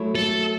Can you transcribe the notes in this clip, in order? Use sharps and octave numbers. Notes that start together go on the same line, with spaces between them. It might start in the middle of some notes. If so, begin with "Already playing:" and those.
Already playing: F#3 A3 E4
A4